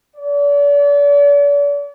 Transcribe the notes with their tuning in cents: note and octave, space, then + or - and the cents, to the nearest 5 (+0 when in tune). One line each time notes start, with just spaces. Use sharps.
D5 -40